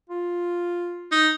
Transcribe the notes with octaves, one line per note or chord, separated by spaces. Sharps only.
F4
D#4